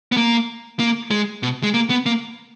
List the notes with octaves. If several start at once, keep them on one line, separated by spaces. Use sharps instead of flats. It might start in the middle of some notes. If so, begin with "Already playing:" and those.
B3
A#3
A#3
G#3
B2
G#3
A#3
B3
A#3